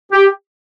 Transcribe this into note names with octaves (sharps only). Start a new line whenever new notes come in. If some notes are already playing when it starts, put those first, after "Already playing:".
G4